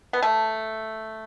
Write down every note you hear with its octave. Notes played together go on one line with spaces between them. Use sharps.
B3
A3